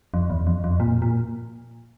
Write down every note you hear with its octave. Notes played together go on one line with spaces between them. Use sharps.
F2
E2
F2
F2
A#2
A#2